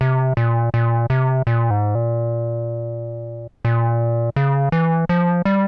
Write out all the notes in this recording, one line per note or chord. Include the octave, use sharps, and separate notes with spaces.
C3
A#2
A#2
C3
A#2
G#2
A#2
A#2
C#3
E3
F3
G3